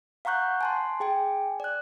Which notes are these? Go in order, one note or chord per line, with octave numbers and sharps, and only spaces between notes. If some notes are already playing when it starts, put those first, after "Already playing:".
F5 F#5 A#5 C#6 F#6 G6
G#5 A5 C6
G#4 G5 G#5
D5 F#6